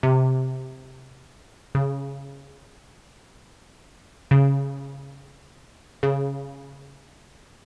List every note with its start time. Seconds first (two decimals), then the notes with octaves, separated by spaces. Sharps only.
0.03 C3
1.75 C#3
4.31 C#3
6.03 C#3